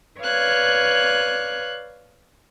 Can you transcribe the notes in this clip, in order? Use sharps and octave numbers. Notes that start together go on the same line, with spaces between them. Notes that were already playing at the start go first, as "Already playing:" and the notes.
B4 C#5 D5 F5 F#6 G#6